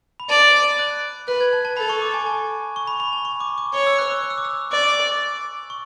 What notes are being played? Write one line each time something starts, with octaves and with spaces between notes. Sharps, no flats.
B5
D5 A5
F#6
B4 F#6
G#6
A5
A5
A4 B5
C#6
D6
G#5
A5
C#6
B5
B5
A5
C#6
D6
D6
C#5 C#6
E6
F#6
E6
F#6
E6
D6
E6
D5 D6
C#6